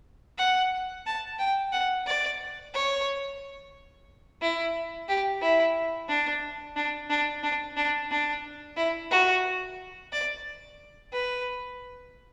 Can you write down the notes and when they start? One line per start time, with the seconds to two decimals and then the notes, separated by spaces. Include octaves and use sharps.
0.38 F#5
1.06 A5
1.39 G5
1.72 F#5
2.06 D5
2.74 C#5
4.42 E4
5.08 G4
5.42 E4
6.09 D4
6.76 D4
7.10 D4
7.43 D4
7.77 D4
8.11 D4
8.77 E4
9.11 F#4
10.12 D5
11.13 B4